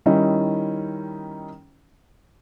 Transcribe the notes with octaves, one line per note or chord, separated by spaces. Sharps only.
D#3 G3 C#4 D#4 E4